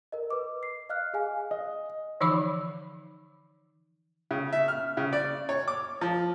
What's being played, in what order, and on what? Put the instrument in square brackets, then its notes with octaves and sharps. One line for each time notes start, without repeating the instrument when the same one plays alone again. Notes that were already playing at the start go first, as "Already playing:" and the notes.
[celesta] A#4 D#5
B4 D6
C7
D#5 F5 F6 F#6
G#4 F5 G#5
[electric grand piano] D#5
[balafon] D3 E3 F3 D#4 B5 D6
[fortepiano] C#3
E5
F6
C#3
D5
C#5
D6
F3